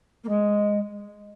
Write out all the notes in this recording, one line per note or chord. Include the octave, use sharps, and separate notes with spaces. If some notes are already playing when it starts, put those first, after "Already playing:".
A#3
G#3